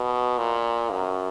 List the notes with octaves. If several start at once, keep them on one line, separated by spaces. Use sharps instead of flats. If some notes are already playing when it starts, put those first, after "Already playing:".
Already playing: B2
A#2
F#2